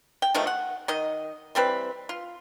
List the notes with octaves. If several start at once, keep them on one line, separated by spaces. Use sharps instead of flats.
G5
B2 D#3 F3 A3
F#5
D#3 D#5
E3 G3 C4 B4
F4